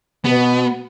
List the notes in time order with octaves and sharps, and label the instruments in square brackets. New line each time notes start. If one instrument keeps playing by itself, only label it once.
[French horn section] B2 [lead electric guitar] B3